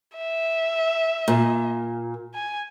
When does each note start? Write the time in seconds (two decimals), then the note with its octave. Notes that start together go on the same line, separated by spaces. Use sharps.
0.17 E5
1.28 A#2
2.35 G#5